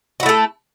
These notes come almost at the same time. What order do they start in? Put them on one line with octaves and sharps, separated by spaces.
F#4 E4 A3 A4